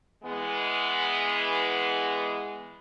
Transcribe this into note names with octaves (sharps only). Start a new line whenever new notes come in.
E3 G#3 B3